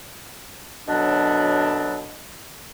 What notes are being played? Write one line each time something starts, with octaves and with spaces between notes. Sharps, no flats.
F#2 B2 D3 F#3 D4